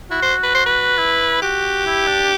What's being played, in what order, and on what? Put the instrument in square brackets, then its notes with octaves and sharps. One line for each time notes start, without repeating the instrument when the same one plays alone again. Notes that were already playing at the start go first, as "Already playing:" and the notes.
[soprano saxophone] E4 [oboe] F#4
[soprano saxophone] C5
B4
C5
B4
[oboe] E4
[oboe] F#4 [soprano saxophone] G4
[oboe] E4
D4